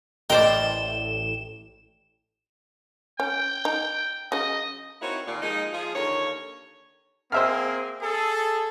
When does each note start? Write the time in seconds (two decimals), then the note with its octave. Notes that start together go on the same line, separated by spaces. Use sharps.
0.30 A1 A2 A#4 C5 D5 D#5 G5 E7
3.20 C#4 G5
3.65 D#4
4.32 C#3 F#3 D#5
5.02 A#3 C4 D#4 E4 F#4 C#5
5.27 D#2 A#2
5.42 F3 G#3 A#3 D#4
5.73 F3 F4 G#4
5.94 D#2 D3 A#4 C#5
7.32 A#3 C4 G#4 C5 E5 F6
8.02 G#4 A4